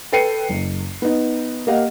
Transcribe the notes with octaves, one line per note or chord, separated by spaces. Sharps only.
A4 B4 G5 C7 C#7 D#7
F#1
B3 D#4
A#3 G4 D#5 F5 F#5